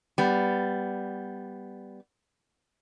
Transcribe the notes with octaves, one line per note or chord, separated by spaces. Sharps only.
G3 B3